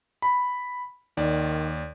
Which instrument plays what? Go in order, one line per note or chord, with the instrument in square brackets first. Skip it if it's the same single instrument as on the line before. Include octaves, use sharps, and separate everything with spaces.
[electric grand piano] B5
[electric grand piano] D#2 D5 [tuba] D#3